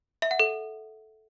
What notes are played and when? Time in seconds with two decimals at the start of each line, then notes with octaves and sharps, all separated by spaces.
0.22 E5
0.31 F#5
0.40 A4